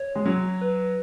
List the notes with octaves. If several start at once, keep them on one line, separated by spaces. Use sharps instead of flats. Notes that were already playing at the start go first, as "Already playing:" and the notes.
Already playing: C#5
G#3
F#3
B4